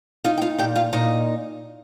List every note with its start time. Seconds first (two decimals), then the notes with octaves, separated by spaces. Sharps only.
0.24 D#4 F4 F5
0.38 G5
0.42 F4 F5
0.58 A#2 G4 G5
0.76 F4 F5
0.93 A#2 D#4 D#5